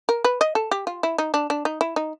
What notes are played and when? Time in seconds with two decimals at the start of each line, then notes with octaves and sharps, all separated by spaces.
0.09 A#4
0.24 B4
0.41 D#5
0.55 A4
0.71 G4
0.87 F4
1.03 E4
1.18 D#4
1.34 D4
1.50 D4
1.65 D#4
1.81 E4
1.96 D#4